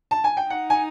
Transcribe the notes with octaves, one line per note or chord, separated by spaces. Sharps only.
A5
G#5
G5
D#4 F#5
G#5